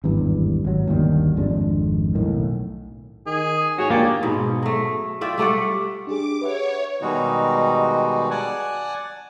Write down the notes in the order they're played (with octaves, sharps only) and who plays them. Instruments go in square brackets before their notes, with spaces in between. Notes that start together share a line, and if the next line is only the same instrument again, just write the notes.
[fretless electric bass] G#1 E2 G2
G#1 F#3
G1 D#2 D#3 G3
G#1 F2 G#3 D4
B1 A2 D#3
[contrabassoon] D#3 [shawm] G#4
[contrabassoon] G#2 [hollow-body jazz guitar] F#4 G#4 [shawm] C#5
[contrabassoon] D2 [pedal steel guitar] A#3 [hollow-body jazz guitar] F4 G4 G#4 [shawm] D5
[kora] G#2 B2
F#3 A3
F4 D5 E5 G5
G3 A3 D5 F#5
[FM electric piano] D4 G4 G#4 [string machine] D6
[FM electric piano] B4 E5 F#5 [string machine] C#5
[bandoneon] B2 D#3 G3 G#3 D#4 F#4
D5 F#5 G#5 A5